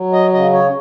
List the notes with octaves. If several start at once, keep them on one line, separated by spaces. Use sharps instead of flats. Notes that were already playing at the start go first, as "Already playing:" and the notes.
Already playing: F#3
D#5
C#3 D#5
C#5